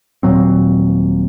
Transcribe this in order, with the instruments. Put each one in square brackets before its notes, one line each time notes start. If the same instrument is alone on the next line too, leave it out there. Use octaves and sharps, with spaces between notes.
[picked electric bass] D#1 A#2 F#3 C4